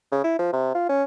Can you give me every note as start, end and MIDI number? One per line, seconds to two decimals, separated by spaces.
0.12 0.20 49
0.24 0.37 64
0.39 0.49 53
0.53 0.70 48
0.74 0.88 65
0.89 1.03 61